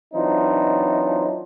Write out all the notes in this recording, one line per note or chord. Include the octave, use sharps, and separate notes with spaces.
E3 F#3 C4 D4 D#4 F4